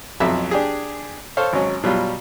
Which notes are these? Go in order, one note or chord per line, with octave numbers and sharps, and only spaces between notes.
B1 F2 F#3 E5 B5 E6
D4 G4 G#4
A4 C5 C#5 F5
G#1 F#3 C#4
B2 F#3 G3 F4